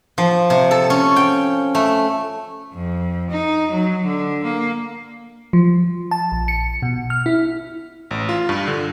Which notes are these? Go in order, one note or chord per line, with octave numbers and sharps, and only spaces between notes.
F3
C3
A4
C#4
G5
A3
F2
D#4
F#3
D3
A#3
F3
A5
A#1
C#7
B2
F6
E4
A1
F4
G2
D3